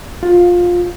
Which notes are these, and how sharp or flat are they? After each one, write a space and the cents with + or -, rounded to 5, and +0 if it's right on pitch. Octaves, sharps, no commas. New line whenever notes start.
F4 +15